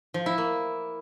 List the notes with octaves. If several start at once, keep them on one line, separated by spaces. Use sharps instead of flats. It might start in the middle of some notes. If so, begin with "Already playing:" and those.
F3
E4
A#3